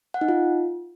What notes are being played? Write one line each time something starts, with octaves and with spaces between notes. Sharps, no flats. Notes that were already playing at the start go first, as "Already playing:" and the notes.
F#5
D#4
F4